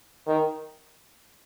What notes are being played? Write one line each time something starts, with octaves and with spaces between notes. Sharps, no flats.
D#3